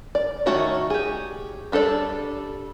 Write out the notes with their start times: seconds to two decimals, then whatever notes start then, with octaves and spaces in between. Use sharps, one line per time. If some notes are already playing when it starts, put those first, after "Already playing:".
0.15 D5
0.46 D#3 A3 F#4 C#5
0.90 G4 G#4
1.72 G3 D4 A4 C5 D5